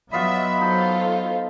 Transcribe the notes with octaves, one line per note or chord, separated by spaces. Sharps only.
F#3 B3 F4 D#5 E5 B5
D#4 F4 A4 C5